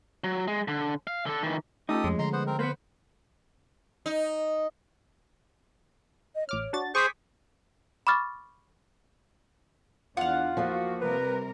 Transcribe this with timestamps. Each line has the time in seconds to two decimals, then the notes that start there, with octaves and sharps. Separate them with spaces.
0.24 F#3
0.48 G#3
0.68 D3
1.07 F5
1.26 D3 A4
1.43 D#3 E3
1.89 A3 C#4 D#4 F4 G4 A4 D#6
2.04 F2 F3 G#3
2.19 D3 D#5 A#5 C6
2.33 B3 C5 F#5
2.47 C4 A#4
2.59 A#3 B3 B4 C5
4.06 D#4
6.35 D#5
6.49 A1 C#5 D6 F6
6.73 D4 F#4 A6
6.95 G#4 C5 G#5 C#6 D6 G6 B6
8.07 B5 C#6 D6 F6 A6
10.17 E2 D4 F4 F5 F#5
10.57 F3 A#3 F#4
11.01 C3 G3 A#4 B4